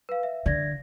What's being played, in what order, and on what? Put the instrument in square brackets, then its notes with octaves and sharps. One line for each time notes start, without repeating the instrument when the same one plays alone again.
[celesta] B4 F5
E5
[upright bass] D3 [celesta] D5 G#6 A#6